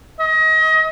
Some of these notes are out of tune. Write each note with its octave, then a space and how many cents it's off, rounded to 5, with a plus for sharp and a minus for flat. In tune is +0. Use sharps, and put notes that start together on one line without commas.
D#5 +30